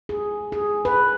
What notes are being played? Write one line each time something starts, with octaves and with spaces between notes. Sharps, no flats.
G#4
G#4
B4